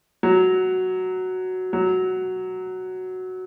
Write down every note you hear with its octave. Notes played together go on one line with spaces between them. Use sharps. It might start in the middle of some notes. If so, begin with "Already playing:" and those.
F#3
F#3